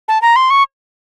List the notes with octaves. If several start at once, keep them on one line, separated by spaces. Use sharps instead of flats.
A5
A#5
C6
C#6